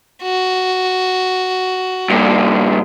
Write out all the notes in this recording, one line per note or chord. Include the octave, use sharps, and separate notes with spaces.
F#4
G2 A#2